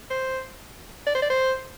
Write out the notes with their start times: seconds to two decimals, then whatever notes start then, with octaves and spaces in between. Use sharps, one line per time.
0.10 C5
1.06 D5
1.15 C5
1.22 D5
1.30 C5